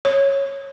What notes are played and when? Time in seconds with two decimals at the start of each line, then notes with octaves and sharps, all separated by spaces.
0.05 C#5